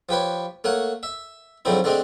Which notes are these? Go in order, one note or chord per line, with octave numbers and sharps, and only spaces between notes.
F3 G4 B4 C#5
A3 A#3 C#5 F#5
E5
G#2 D3 F3 F#3 C4 E4
D3 G#3 A3 C4 D4